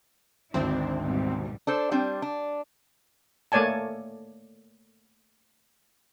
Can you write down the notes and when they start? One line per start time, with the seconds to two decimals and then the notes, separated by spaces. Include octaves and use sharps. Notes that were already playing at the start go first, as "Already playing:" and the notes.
0.54 G#1 D2 C4 D4 E4
1.00 G#2 B2 G3
1.67 D4 A4 C5
1.91 G3 C4 D4
2.22 D4
3.52 A3 A#3 C#5 D5 G#5 A5